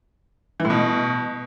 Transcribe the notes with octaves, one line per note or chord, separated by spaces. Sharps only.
E3
A2
B2